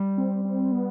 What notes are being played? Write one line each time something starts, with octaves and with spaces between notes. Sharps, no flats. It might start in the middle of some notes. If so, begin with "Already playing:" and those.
Already playing: G3
C4
C4
B3